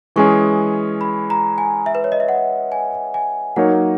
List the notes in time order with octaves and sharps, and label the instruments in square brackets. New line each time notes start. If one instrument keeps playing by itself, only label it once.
[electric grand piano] E3 G#3 C#4 G#4 [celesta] C#6
[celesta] B5
A#5
G#5
E5
B4
C#5
D#5
E5
F#5
G#5
G#5
[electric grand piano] F#3 A#3 D#4 A#4 C#5 [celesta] F#5